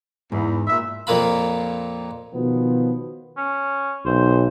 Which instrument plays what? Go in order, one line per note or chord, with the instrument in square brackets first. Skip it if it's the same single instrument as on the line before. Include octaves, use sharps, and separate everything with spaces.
[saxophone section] E2 [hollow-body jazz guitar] G#2
[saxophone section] A#2 E5
[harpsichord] F2 A#2 A#3 F4 B5
[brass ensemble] B2 D#3 F3 B3
[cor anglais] C#4
[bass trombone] B1 [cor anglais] C5